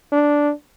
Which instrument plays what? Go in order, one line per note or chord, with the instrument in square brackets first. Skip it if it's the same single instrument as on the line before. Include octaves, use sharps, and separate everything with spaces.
[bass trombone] D4